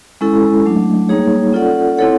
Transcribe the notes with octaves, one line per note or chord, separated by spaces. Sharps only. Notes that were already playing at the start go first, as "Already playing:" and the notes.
G#3 C#4 E4 A4
F#3 A3 D4
G3 A#3 D#4 G#4 C#5
C#4 F4 A4 D5 F#5
C4 E4 A4 C#5 F#5